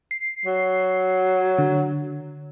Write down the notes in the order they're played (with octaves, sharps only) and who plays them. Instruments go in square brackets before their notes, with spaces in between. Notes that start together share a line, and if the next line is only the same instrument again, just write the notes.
[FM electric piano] C7
[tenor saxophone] F#3
[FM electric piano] D3